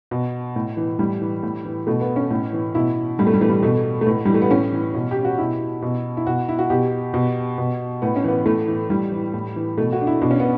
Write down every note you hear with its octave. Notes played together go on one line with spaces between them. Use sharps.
B2
A2
E3
A2 G3
E3
A2
E3
B2 A3
B3
C#4
A2
E3
B2 E4
A2 G3
A3
G3
E3 A3
G3
B2 A3
A3
A2 B3
E3 G3
A3
B3
A2 C#4
E3
B2
G4
F#4
B2 E4
B2
E4
B2 F#4
E4
F#4
B2 G4
B2
B2
A2 B3
C#4
E3 B3
A2 A3
E3
A2 G3
E3
A2
E3
B2 A3
F#4
D4
E4
B2 D4
C#4
B3